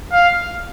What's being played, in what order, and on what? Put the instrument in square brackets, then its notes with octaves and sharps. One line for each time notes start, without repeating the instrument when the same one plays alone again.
[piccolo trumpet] F5